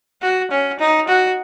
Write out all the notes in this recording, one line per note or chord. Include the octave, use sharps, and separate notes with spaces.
F#4
C#4
D#4
F#4